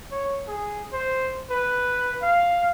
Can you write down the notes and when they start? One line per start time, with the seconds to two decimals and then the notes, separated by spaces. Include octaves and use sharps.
0.11 C#5
0.48 G#4
0.93 C5
1.51 B4
2.22 F5